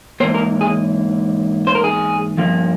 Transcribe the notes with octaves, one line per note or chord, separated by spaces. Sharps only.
G#2 E3 A#3 C5
A#4
G#4
C5
A#4
G#4
G2 F3 A#3